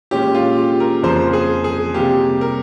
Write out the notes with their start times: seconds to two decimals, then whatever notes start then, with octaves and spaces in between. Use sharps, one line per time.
0.11 A#2 G#3 C#4 G4
0.35 F4
0.58 G4
0.80 A#4
1.03 F2 C#3 F3 A#3 C5
1.33 G#4
1.64 G#4
1.94 C3 G3 A#3 G4
2.41 A#4